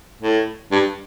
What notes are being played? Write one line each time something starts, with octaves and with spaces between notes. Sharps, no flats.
A2
G2